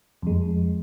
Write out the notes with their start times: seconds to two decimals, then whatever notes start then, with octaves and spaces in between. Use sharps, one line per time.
0.22 F2 G#3